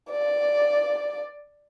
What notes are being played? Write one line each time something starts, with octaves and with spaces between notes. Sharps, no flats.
D5